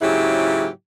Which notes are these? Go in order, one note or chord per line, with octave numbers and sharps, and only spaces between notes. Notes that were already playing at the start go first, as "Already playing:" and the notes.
G#2 C#3 F#3 A#3 E4 G4